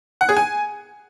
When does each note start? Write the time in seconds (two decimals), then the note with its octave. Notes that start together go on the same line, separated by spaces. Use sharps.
0.21 F#5
0.29 G#4
0.37 G#5